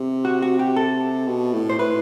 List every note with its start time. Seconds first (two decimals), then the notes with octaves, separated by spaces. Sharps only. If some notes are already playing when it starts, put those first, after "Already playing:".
Already playing: C3
0.25 F#4
0.42 F#4
0.59 G4
0.76 A4
1.27 B2
1.53 A2
1.70 C5
1.79 A2 B4